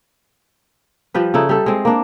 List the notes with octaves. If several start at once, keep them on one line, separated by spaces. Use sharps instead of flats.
F3 G3 B4
C#3 D#4 E4 A4
G3 A4
G#3 C4
A#3 D4